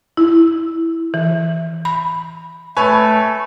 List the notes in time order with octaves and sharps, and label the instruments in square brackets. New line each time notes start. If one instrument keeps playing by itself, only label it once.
[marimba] E4
E3
B5
[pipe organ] A3 [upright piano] B4 C#5 G#5